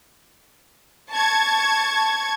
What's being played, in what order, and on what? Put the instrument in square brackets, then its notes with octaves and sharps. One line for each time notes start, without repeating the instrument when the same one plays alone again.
[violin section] A5 C#6 G#6